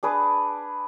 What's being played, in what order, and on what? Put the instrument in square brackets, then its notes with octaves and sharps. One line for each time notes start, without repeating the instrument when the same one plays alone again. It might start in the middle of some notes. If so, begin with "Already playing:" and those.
[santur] D4 G#4 B4 D5